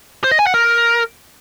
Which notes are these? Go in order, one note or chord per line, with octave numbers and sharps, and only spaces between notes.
C5
D#5
G#5
F#5
A#4